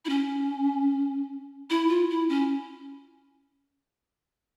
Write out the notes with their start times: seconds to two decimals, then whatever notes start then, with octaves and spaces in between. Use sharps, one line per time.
0.05 E4
0.09 C#4
1.70 E4
1.89 F4
2.10 E4
2.29 C#4